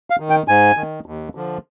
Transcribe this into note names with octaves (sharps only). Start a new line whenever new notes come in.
F5
D#3
G5
G#2 G#5
D#3
D#2
D3 F3